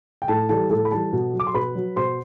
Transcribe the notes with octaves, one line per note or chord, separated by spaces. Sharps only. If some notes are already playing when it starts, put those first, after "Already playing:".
G5
A2 A4 A5
E3 G3 A4 A5
A2 A4 A5
B5
E3 G3 A4 A5
B2
F#3
D6
C6
B2 B4 B5
F#3
B2 C5 C6